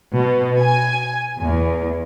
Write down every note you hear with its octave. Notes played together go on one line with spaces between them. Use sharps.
B2
G#5
E2